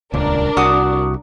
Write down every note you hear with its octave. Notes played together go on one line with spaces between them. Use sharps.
D#1 C#2 D4 A#4
C2 F#4 D6 D#6